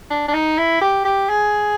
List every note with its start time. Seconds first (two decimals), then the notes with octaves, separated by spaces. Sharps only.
0.11 D4
0.28 D4
0.34 D#4
0.58 E4
0.82 G4
1.05 G4
1.29 G#4